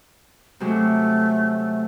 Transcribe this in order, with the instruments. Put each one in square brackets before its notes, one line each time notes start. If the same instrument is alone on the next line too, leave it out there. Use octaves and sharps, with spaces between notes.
[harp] C3 F#3 G#3 [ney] A3